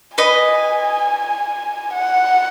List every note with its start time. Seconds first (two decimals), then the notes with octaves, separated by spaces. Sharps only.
0.18 B4 D#5 G#5
1.95 F#5